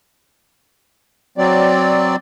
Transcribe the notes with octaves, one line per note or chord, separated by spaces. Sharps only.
F#3 C4 D5